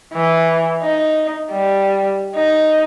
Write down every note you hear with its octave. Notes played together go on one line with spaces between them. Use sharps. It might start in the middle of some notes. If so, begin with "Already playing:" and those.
E3
D#4
G3
D#4